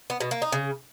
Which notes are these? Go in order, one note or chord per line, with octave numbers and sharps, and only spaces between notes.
B3
B2
A#3
D#4
C#3